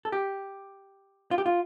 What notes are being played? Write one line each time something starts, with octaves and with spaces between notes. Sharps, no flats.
A4
G4
F4
G4
F4